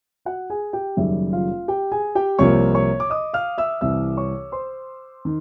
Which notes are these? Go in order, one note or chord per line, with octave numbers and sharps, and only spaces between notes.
F#4 F#5
G#4 G#5
G4 G5
F#1 F#2 D#3 G3 E5
F4 F5
G4 G5
G#4 G#5
G4 G5
C2 C3 F3 A#3 C#5 C#6
C#5 C#6
D6
D#5 D#6
F5 F6
E5 E6
C2 C3 E3 E5 E6
C#5 C#6
C5 C6
D#3